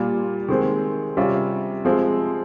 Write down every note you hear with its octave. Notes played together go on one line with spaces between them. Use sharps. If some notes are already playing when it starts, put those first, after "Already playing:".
Already playing: A#2 G3 A#3 F4
D#3 G#3 C4
C3 G3 C#4 F4
F3 G#3 C4